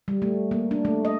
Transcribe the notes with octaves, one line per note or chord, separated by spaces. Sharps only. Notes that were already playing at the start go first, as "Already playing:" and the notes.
G3
A3
A#3
D4
A3
D#5